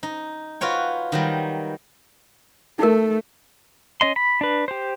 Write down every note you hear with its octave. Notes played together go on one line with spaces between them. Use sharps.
D#4
F4 F#4 B4 C#5 G5
D#3 F#3 G3
A3 D#4 A#4
C#4 D#5 C6
B5
D4 B4
G4 C5